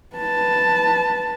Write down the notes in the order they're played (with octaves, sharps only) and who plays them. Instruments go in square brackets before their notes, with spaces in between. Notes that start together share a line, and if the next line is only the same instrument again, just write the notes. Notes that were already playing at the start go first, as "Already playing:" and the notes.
[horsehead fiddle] B4 A5